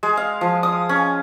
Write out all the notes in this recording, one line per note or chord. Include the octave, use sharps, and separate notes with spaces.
G#3
F5
F3
D#6
C#4